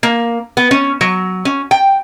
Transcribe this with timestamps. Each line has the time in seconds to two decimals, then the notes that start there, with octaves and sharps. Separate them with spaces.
0.03 A#3
0.57 B3
0.71 C#4
1.01 F#3
1.45 C#4
1.71 G5